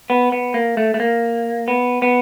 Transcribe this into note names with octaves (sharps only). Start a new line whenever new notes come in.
B3
B3
A#3
A3
A3
A#3
B3
B3